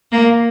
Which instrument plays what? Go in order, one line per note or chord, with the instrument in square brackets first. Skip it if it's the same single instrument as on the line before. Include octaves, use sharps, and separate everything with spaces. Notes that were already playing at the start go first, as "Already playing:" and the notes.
[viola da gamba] A#3